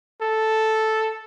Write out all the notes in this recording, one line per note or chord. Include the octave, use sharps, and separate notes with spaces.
A4